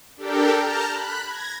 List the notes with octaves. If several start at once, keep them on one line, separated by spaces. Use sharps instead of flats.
D4 G4 A4 A#4 G5
A5 A#5 F6 G6
B5 F#6
G#6 A#6